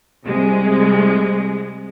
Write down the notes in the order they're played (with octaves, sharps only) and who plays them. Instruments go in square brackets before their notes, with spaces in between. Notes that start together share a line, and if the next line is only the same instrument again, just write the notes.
[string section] C2 G#3